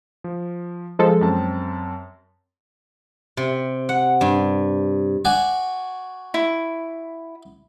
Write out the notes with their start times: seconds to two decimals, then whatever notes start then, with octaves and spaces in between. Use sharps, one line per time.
0.24 F3
0.99 F3 G#3 A4
1.21 F#2 C4 A5
3.37 C3
3.89 F#5
4.21 G2
5.25 F#4 D5 G#5
6.34 E4